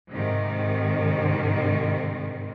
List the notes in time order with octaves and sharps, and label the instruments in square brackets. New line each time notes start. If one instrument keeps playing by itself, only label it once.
[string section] G#2 C3 D#3